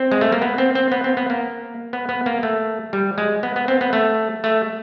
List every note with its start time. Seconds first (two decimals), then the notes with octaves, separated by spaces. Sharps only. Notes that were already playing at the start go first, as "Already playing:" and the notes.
Already playing: C4
0.12 G#3
0.21 A3
0.32 A#3
0.42 B3
0.58 C4
0.75 C4
0.92 B3
1.04 C4
1.17 B3
1.30 A#3
1.93 B3
2.09 B3
2.26 A#3
2.43 A3
2.93 G3
3.18 G#3
3.43 B3
3.56 B3
3.68 C4
3.81 B3
3.93 A3
4.44 A3